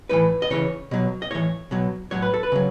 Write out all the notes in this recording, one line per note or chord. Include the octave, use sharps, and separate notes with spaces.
A2 E3 B4
D#5
C#3 E3 C#5
B2 F#3
D#5
A2 E3 C#5
B2 F#3
A2 F#3 C#5
B4
A4
B4
C#3 F#3